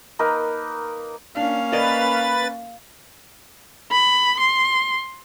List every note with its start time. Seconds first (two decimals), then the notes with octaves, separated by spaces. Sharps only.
0.19 A#3 D#4 A#4 B4
1.37 A#3 C#4 D4 F5
1.72 A#4 B4 D5 D#5 A6
3.91 B5
4.40 C6